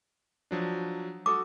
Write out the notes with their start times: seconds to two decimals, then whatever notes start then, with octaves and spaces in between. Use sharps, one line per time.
0.51 F3 F#3 D4
1.26 F#4 A4 D6 D#6